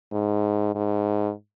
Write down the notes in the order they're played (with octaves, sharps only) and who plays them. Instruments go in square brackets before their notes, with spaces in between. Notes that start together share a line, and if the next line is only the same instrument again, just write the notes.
[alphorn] G#2
G#2